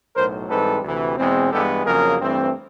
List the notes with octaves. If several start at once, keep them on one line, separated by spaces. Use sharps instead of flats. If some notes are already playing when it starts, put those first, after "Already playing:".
B1 A2 F#3 A#4 C5
G#2 E3 G3 C4 A4 B4
D2 C3 E3
E2 B2 G#3 C4
G2 E3 G#3 B3 G4 A4
F2 C#3 F#3 A#3 G#4 A#4
G2 E3 A3 C4